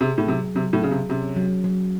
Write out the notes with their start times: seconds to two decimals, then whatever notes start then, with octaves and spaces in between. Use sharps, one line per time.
0.01 C3 G#4
0.18 A2
0.27 C3 F#3
0.55 C3 F#3
0.73 A2
0.83 C#3 G#4
0.91 C3
1.10 C3 C#4
1.36 F#3
1.64 F#3